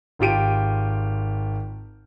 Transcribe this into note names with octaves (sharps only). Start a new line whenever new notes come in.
G#1 F4 G4 D7 D#7